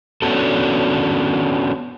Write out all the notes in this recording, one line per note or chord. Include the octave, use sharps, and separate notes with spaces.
B3 C#4 D4 F#4 A4